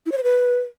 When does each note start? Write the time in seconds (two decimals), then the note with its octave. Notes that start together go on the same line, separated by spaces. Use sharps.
0.06 E4
0.12 C#5
0.17 C5
0.23 B4